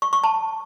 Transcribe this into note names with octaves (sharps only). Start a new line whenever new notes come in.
C#6
C#6
A5